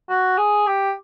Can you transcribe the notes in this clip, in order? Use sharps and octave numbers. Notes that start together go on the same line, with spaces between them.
F#4
G#4
G4